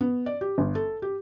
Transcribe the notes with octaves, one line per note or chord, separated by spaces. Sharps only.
B3
D5
G4
G1
A4
G4